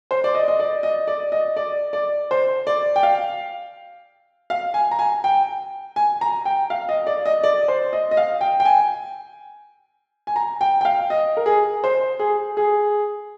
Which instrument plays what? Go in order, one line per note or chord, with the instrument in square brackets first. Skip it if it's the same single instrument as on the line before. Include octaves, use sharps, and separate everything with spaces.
[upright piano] C5
D5
D#5
D#5
D5
D#5
D5
D#5
D5
D5
C5
D5
G5
F5
F5
G#5
A#5
G#5
G5
G#5
A#5
G5
F5
D#5
D5
D#5
D5
C5
D#5
D#5
F5
G5
G5
G#5
G#5
A#5
G5
G5
F5
D#5
A#4
G#4
C5
G#4
G#4